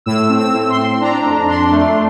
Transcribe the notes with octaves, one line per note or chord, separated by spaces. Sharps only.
A2 E6
C4
E6
A2
C6
C4
D4 A#5
F2
D4 C6
A3